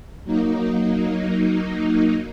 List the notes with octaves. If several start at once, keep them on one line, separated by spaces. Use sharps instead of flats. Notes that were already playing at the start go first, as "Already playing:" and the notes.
F#3 A#3 D#4